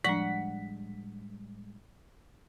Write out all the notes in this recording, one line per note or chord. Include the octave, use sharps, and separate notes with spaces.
A2 F3 G3 G#3 D4 F#5 B6